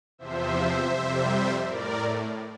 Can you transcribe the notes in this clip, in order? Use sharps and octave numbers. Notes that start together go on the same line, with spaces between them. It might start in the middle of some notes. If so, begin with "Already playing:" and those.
E2 C3 F3 C5 E5
F2 C3 G3
A2 A#4 D5